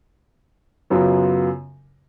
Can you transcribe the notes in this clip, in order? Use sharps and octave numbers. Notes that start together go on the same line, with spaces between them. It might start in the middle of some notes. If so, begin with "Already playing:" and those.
F#2 C#3 F#3 B3 F4